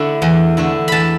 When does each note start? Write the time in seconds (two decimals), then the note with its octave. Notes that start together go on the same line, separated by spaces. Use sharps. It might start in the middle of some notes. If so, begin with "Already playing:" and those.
Already playing: D3 A3 E4
0.22 E2
0.57 D3 A3 E4
0.88 E2 A5 B5